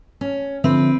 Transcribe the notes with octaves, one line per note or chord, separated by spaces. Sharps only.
C#4
D3 F3 C4 B4 E5